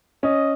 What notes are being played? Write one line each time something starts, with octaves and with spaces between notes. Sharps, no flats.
C#4 D#5